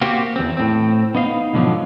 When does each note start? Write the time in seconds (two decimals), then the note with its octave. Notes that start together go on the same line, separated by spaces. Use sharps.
0.01 A#3 C4 F#4 G4
0.36 E2 C4
0.57 A2 C4
1.15 B3 D#4 F5
1.53 G#2 B2 D3 F3 F#3